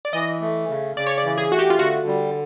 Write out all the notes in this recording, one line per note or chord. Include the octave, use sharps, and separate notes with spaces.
D5
E3 D#5
A3
C#3
C#3 D5
C#5
D5
E3
G#4
A3 F#4
G4
F4
D3 F#4
G3